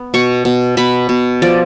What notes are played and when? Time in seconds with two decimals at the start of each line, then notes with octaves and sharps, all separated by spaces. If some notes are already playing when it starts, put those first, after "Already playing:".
Already playing: B3
0.14 B2 C#6
0.45 B2
0.77 B2 B5
1.09 B2
1.42 F3 D5